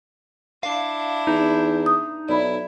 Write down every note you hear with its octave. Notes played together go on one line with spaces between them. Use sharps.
D4 E4 F5
E2 D#4
D#6
B1 E4 D5 B5